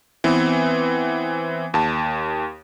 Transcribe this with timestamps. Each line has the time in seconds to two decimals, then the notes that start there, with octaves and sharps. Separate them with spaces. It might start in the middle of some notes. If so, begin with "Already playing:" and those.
0.24 E3 B3 C4
1.74 D#2 A5